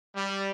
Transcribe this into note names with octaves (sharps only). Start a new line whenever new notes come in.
G3